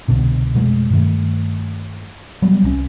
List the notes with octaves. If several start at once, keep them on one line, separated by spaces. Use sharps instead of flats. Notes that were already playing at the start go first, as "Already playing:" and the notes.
C2 B2 D3
F2 B2 G#3 A3
G2 D#3 A3
F#3 G3 B3
C2 F#3 C#4